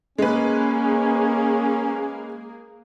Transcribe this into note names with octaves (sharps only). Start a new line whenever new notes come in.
G#3 A#3 C#4 G#4 B4